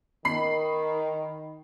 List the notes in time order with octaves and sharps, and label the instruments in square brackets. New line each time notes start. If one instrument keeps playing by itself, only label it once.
[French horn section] D#3 [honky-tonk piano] B5 C7